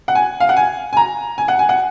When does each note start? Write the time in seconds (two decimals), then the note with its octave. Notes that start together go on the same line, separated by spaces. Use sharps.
0.08 F#5
0.15 G#5
0.40 F5
0.49 F#5
0.57 G#5
0.93 G#5
0.97 A#5
1.38 G#5
1.48 F#5
1.59 G#5
1.69 F#5